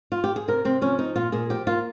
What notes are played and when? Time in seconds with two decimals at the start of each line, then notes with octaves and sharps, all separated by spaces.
0.12 F4
0.24 G4
0.36 G#4
0.48 C3 A#4
0.65 C3 C4
0.81 F3 C#4
0.98 C4 D#4
1.16 A#2 F4
1.32 A#2 G#4
1.50 F3 G4
1.67 A#3 F4